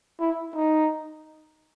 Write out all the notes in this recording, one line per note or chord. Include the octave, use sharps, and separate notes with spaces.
E4
D#4